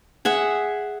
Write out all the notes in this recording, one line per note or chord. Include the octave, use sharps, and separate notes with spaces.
G#4 E5 F#5